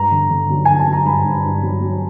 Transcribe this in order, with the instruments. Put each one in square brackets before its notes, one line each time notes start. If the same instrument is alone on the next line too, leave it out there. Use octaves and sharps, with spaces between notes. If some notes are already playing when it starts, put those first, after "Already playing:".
Already playing: [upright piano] G2 A#5
D3
D3
F#3
D3 G#5
A5
F#3
A#5
G2 B5
G2
G2
F#3
F#3